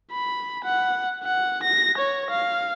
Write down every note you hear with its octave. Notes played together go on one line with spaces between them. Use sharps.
B5
F#5
F#5
A#6
C#5
F5